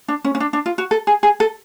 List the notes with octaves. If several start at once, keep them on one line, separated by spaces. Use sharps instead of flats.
D4
C#4
C#4
D4
D4
F4
F#4
A4
G#4
G#4
A4